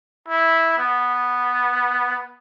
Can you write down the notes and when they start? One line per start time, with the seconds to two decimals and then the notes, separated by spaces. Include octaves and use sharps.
0.28 E4
0.79 B3